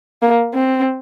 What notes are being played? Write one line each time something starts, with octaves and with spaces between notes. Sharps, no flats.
A#3
C4